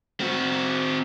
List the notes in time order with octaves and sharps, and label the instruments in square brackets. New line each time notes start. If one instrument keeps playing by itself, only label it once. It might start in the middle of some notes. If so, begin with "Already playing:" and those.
[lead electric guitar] C4 F#4